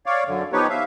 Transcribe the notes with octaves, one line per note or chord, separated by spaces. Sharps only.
C#5 D5 F5
F#2 D3
F3 B3 D#4 G4 B4 C#5
E5 F5